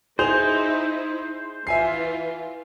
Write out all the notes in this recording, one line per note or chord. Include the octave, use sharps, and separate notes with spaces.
D#4 E4 G#4 C5 F7
E3 F4 E5 G#5 C7